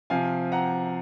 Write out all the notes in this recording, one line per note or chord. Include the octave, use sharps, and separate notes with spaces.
C3 F3 C4 F5 G#5
F#5 A#5